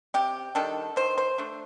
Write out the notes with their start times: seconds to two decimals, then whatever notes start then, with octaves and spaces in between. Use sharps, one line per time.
0.14 C3 G4
0.55 D#3 G3 D4 A4
0.96 D#3 C5
1.18 C5
1.38 A3 D4